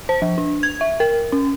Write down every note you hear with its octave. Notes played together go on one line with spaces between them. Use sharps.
C5
F3
D4
G#6
E5
A#4
C#4